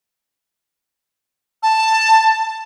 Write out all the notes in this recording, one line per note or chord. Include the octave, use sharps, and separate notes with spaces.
A5